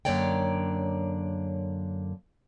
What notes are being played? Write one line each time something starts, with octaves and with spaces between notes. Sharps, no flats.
F#2 D3 A#3 C#5 D5 G5